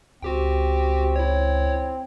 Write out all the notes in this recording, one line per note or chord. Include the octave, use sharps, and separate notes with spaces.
C#2 C4 F#4 G4 G5
E4 C#5